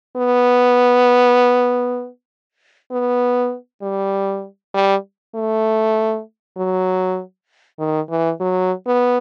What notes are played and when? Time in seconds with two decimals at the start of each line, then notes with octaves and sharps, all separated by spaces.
0.16 B3
2.91 B3
3.82 G3
4.74 G3
5.35 A3
6.57 F#3
7.79 D#3
8.10 E3
8.40 F#3
8.87 B3